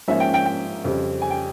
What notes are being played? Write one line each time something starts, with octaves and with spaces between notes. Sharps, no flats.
G#2 F3 A#3 C#4 E5
G5
G5
G5
F2 C#3 G3 C4
G#5
G5